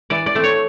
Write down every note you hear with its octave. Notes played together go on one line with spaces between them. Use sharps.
E3 D5
D5
A3 C4
C#5